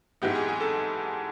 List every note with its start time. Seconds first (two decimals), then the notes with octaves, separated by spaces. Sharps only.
0.22 G#2 E3 G#3 B3 G4
0.35 G#4
0.49 G#4
0.61 A4